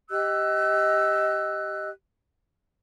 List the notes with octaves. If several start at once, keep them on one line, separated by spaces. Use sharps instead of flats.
G4 D#5 E6 F#6